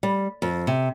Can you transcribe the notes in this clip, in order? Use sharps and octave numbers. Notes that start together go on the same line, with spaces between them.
G3
F2
C3